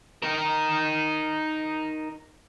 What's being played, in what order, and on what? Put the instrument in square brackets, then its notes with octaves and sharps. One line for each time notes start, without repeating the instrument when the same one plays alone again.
[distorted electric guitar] D#4 A#4